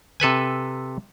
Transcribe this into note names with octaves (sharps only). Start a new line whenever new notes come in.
C3 A4 B4 G#5